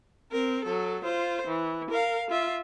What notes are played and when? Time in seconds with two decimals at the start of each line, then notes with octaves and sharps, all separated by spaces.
0.32 C4 A#4
0.64 F#3 A4
1.04 F4 C5
1.47 E3
1.90 A#4 F5
2.30 F4 E5